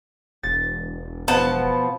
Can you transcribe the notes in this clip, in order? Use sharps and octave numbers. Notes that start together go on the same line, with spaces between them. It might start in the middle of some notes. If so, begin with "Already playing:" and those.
E1 A6
B2 F3 B3 A5